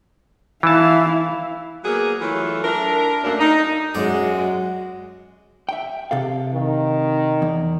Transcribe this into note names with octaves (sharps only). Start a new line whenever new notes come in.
E3 E4 F5 A5
F#3 A#3 B3 G#4
E3 F#3 A3 F4
D4 E4 A#4
F#2 A3 A#3 D4
D#4
F#2 G#3 F#4 D5
E5 G5
C3 A4 F5
D#3
E2